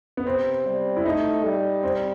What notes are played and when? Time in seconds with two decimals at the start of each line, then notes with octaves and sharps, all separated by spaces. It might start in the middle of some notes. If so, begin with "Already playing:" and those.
0.17 B3
0.26 C3 C4
0.66 G3
0.97 E4
1.05 A3 D#4
1.44 G3
1.83 C4